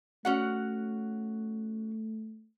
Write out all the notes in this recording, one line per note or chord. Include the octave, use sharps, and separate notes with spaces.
A3 C#4 F#4 F#5